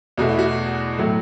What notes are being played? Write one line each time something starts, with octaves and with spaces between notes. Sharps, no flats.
E2 B2 A3 F#4
E4
F#4
A2 F#3 A3